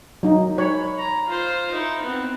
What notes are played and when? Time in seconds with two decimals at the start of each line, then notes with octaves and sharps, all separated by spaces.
0.23 F#3 D#4
0.58 C#5 B5
0.98 A#5
1.27 F4 C5
1.71 D#4 E4
2.03 B3 C4